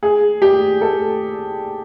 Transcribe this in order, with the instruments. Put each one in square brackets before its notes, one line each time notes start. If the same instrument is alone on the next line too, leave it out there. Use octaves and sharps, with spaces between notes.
[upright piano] G#4
G4
A4